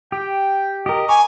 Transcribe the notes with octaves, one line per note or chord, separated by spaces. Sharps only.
G4 G5
G4 A#4 D#5
G#5 A#5 C#6 D6